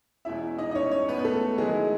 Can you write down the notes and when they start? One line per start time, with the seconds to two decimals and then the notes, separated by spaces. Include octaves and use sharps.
0.25 E2 B2 G#3 C#4 E4 E5
0.58 D#4 D#5
0.71 D#5
0.75 C#4 C#5
0.91 C#4 C#5
1.08 B3 B4
1.19 B4
1.25 A3 A4
1.58 D#3 F#3 G#3 A3 E4 G#4